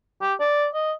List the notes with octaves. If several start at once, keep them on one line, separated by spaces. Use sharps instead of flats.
G4
D5
D#5